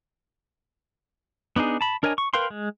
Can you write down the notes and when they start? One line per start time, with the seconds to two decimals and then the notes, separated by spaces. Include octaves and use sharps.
1.56 B3 D4 D#4 G#4
1.81 A5 B5
2.03 D4 A#4 C#5 D#5 G#5
2.18 C#6
2.34 A#4 B4 F5 G5 C6
2.50 G#3